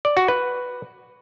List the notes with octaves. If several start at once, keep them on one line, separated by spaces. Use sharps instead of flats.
D5
F#4
B4